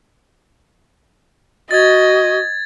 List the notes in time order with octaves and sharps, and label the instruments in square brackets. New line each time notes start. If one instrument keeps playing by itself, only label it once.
[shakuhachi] F#4 [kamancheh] D#5 [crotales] G#6 A6